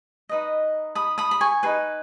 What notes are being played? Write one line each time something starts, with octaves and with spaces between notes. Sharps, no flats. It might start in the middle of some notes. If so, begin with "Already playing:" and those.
D#4 B4 D#5
B5 D#6
B5 D#6
B5
G#5 C#6
D#4 G#4 B4